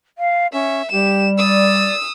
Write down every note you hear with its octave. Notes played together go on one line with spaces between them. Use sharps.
F5
C#4 E5
G3 G4 E7
D5 D#6 E6